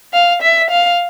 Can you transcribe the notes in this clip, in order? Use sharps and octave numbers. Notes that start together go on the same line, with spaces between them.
F5
E5
F5